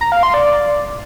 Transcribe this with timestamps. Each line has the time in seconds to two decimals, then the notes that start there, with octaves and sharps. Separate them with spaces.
0.01 A#5
0.12 F5
0.23 C6
0.34 D5